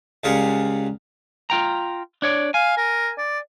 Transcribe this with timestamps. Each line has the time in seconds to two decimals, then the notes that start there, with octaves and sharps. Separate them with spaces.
0.24 C#2 G3 F4 G#4 A#4 F#5
1.50 F4 G5 A#5
2.22 D4 C#5 D5
2.54 F5 G#5
2.77 A#4
3.18 D5